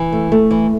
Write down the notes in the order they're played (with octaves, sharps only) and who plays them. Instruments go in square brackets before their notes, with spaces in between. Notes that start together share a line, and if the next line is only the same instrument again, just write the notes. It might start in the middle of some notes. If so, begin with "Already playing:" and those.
Already playing: [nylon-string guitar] E3
A3
A3
E3